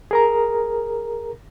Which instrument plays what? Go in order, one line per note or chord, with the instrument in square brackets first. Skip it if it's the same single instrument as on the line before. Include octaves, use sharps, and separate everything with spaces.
[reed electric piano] G#4 A#4 A#5